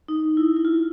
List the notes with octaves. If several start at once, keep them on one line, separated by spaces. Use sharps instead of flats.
D#4
E4
E4
F4